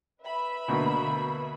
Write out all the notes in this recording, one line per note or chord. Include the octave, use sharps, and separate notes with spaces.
B4 E5 B5
D2 B2 A#3